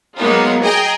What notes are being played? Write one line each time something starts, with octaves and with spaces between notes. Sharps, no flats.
F#3 G#3 A#3 B3 D#4 F4
G#4 D#5 G5 G#5 A#5